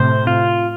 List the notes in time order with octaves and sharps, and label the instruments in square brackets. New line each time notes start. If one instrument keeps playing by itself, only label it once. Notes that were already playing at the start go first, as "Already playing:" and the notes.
Already playing: [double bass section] A2 C3 [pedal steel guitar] C5
[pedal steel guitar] F4